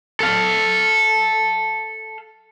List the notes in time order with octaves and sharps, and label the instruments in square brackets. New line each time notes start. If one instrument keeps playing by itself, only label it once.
[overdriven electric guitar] A4 F5